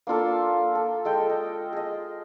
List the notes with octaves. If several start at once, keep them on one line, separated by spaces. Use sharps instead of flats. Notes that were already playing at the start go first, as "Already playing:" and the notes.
A#3 D4 F4 A4
A4
G#3 A4 G5
D#5
G#4 D#5